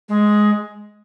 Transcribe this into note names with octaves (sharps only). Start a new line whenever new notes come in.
G#3